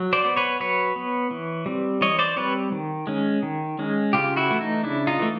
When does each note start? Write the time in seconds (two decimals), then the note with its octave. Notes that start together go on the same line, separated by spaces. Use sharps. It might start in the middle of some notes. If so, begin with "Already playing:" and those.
Already playing: F#3
0.13 C5 D5
0.25 B3
0.37 B4 C#5
0.60 F#3 B4 C#5
0.96 B3
1.31 E3
1.66 G3 C4
2.01 E3 C#5 D#5
2.19 C5 D5
2.37 G3 C4 B4 C#5
2.72 D#3
3.07 G#3 C#4
3.43 D#3
3.79 G#3 C#4
4.13 C#3 F4 G4
4.36 E4 F#4
4.48 E3 A3
4.61 D#4
4.84 C#3 D4 E4
5.07 D#4 F4
5.19 E3 A3